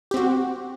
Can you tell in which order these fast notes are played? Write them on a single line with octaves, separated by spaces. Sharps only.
G4 C4 F#4